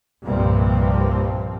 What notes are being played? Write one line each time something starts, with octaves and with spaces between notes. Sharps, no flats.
C2 G2 A#2 F3 A#3 C4